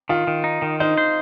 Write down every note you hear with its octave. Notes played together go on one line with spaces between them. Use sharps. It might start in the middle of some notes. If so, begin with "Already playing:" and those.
D#3 F4
D#3
D#4
D#3
D#4 C5
C5